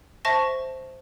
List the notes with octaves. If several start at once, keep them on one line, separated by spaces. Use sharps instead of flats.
C5 E5 A5 C#6 A#6